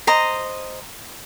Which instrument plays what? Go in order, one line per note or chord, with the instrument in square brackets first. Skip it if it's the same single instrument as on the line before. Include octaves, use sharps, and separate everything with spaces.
[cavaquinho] C5 D#5 A#5